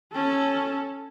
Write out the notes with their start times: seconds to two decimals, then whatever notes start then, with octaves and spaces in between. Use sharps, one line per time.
0.13 C#4 A4